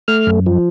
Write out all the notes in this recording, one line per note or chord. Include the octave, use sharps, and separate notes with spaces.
A3 F6
F#2
F3